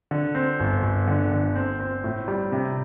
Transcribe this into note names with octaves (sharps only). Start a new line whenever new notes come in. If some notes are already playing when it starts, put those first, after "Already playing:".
D3
C4
G1
G1
D3
D3
C4
C4
A2
G3
C3